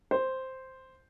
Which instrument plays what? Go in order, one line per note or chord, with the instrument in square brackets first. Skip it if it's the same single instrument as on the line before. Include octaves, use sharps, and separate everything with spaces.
[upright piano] C5